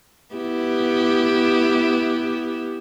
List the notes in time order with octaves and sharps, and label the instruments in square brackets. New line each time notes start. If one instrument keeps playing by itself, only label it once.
[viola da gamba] B3 E4 G4